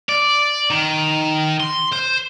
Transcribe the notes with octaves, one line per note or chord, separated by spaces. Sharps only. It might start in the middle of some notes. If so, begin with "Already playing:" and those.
D5
D#3
C6
C5